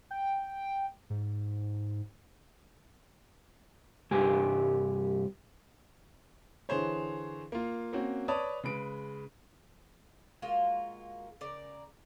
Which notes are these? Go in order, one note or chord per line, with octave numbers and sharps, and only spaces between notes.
G5
G#2
C2 G2 G4 G#5
D3 E3 G#4 C5 C#5
A#3 F4
A#3 C4 C#4 F#4
B4 C#5 D5 A5 D#6
C#3 G#3 B4 D7
G#3 A#3 F4 F#4
C#3 A#4 D5